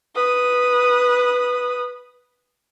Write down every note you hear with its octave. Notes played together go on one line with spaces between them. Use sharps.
B4 D#6